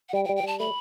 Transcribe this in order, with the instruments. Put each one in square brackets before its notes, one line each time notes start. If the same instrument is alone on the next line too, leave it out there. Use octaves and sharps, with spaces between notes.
[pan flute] F#5
[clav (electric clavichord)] G3 [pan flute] G5
[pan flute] G5
[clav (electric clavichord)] G3
[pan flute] G5
[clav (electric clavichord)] G3 [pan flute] A5
[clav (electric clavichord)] A3 [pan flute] B5